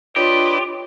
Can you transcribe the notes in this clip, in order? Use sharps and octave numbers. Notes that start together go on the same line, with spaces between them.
D4 F4 G4 B4 C#5 D#5